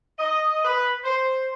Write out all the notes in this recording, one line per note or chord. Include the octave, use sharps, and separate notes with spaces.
D#5
B4
C5